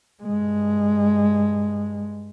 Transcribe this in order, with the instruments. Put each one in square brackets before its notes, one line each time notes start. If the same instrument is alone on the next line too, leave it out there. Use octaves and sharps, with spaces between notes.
[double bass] G2 G#3